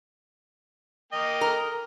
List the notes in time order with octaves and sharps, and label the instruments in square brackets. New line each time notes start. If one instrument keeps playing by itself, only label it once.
[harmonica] A#3 D#5 G5
[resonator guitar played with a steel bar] A#4